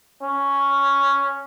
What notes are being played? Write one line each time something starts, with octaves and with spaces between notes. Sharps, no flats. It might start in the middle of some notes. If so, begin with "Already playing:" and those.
C#4